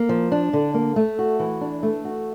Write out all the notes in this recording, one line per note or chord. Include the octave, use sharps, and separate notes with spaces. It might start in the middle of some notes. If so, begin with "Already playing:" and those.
Already playing: A#3
F3
D4
D3
A#3
A3
F#4
E3
D4
A3
F#4